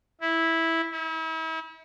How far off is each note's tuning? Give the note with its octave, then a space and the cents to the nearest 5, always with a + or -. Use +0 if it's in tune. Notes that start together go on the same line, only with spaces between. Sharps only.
E4 -10
E4 -40